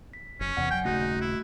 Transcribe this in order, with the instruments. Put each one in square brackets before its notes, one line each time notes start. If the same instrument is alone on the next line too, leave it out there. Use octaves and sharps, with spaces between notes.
[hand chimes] B6
[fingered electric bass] F#1 [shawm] C#4
[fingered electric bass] E2 C3 E3 [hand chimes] D5 F#5
[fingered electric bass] F#1 F#3 [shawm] G5 [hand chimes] G#5 G6
[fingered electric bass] D#1 C#3 [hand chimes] A3 F#4 F#6 [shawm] D#4
[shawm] E4